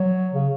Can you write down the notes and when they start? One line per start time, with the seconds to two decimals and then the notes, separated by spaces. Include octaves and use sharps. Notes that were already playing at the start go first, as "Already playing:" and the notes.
Already playing: F#3
0.33 C#3